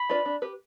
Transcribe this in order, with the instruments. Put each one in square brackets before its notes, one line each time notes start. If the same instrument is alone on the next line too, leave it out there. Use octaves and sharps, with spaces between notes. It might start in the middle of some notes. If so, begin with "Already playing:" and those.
Already playing: [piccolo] B5
[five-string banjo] D4 F4 B4 D5
D4
G4 B4